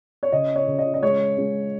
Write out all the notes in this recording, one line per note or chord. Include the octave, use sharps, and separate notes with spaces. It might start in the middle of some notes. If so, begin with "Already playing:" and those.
C#5
C#3 D#5
C#5
C#3
D#5
D#5
G#3 C#5
G#3